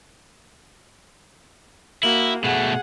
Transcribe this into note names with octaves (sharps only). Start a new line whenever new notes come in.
A#3 E4 F#4
B2 A3 G#4 F#5